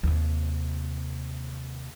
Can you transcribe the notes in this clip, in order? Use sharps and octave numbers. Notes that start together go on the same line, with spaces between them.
D#2 C3